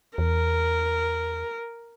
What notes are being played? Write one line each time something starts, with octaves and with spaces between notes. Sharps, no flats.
E2 A#4